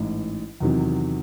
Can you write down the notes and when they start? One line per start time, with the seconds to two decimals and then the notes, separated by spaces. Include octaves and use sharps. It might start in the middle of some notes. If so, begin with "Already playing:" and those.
Already playing: A1 G#2 E3
0.60 E2 C3 D#3 F#3